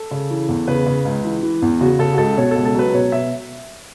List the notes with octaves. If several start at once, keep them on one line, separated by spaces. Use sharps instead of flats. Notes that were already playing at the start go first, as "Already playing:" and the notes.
Already playing: A4
C#3
E3
E2
C#3 B4
C#3
C#2
E3
E3
E2
C#3 F#4
C#3 A4
F#4
C#2 A4
B2 C#5
C#2 A4
A4
F#3 B4
B2 C#5
B2 E5